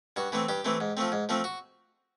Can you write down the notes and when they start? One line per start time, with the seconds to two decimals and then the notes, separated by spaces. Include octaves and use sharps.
0.16 G2 F#4
0.32 E3 A3 C4
0.49 G2 G4
0.65 E3 A3 C4
0.80 G#2
0.97 F3 A3 C4
1.12 G#2
1.29 F3 A3 C4
1.44 F#4